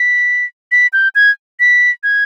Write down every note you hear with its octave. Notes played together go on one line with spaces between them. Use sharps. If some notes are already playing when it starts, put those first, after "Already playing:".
Already playing: B6
B6
G6
G#6
B6
G#6